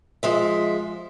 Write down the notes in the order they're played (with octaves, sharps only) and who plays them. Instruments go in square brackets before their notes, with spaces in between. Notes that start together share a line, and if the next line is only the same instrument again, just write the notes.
[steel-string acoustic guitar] F3 G#3 E5